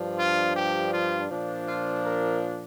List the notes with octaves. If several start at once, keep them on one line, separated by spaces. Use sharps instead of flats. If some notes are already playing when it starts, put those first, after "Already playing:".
Already playing: G2 F3 D4
F4
G4
F4
A#2 F3 D4
F4
A#4